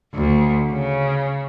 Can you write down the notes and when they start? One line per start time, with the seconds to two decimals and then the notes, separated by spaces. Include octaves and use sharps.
0.14 D2
0.71 C#3